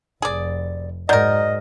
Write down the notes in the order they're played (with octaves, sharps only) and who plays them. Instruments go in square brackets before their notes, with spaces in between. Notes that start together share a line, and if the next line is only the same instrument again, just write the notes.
[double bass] F1 [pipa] G#4 D5
[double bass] G#2 [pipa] F#3 A#4 [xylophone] D5 G6 [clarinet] D#5